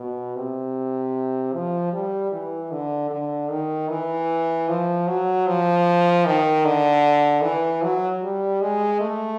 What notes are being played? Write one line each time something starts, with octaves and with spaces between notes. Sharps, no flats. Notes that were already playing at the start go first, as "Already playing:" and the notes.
Already playing: B2
C3
F3
G3
E3
D3
D3
D#3
E3
F3
F#3
F3
D#3
D3
E3
F#3
G3
G#3
A3